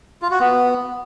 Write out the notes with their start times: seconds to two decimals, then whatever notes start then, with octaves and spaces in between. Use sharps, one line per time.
0.22 F4
0.31 F#4
0.40 B3